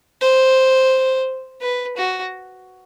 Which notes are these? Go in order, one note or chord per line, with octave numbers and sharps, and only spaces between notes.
C5
B4
F#4